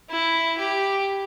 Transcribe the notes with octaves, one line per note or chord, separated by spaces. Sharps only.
E4
G4